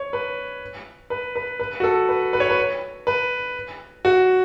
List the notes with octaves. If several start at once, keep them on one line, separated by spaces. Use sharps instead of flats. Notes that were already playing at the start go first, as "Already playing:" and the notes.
Already playing: C#5
B4
B4
B4
B4
F#4
A4
B4
B4
C#5
B4
B4
F#4